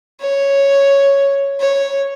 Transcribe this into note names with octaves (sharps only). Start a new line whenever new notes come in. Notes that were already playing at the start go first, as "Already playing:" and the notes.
C#5
C#5